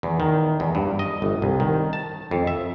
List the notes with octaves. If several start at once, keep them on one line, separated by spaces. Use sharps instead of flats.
E2
D#3
E2
G2
D#5
G1
C2
D#3
A5
F2
E5